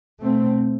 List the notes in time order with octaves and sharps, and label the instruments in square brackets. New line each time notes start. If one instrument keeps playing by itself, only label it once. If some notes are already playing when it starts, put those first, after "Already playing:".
[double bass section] B2 A3 C4